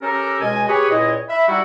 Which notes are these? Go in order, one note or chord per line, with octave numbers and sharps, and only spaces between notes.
C#4 G4 A4 A#4
C#2 B2 G#3 D#5 G#5
G4 G#4 B4 C#5
C#2 A#2 E4 C#5 D#5
E5 B5
G3 D#4 E4 F#4